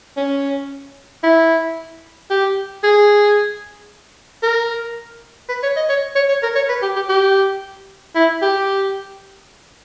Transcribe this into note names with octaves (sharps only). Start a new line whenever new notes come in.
C#4
E4
G4
G#4
A#4
B4
C#5
D#5
C#5
C#5
C#5
A#4
C#5
B4
G4
G4
G4
E4
G4